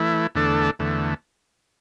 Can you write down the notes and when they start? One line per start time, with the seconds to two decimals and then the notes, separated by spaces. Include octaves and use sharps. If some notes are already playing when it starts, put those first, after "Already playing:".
Already playing: E3 A3 E4
0.35 E2 D3 A3 D4 A4
0.79 E2 D3 A3